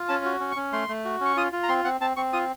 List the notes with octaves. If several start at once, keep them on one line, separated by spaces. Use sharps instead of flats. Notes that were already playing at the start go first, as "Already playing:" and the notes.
Already playing: F4
C#4 A5
F#4
C#4
C#6
C#4
A3 C6
A3
F#4
C#4 C#6
F4 D#6
F4
A#5
C4 C6
C4 F#5
C4 A5
C4 C#6
F4 D#6